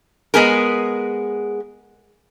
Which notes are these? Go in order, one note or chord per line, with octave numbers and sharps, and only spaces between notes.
G#3 B3 G#4 A#4